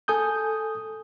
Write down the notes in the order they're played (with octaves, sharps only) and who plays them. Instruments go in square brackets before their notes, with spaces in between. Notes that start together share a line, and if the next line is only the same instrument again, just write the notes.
[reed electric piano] A4 G#5 D#6 G6